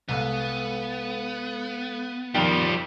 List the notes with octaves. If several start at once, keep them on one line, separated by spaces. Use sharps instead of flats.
C2 G#3 B3 A4 F5
F2 D#3 F3 G3 G5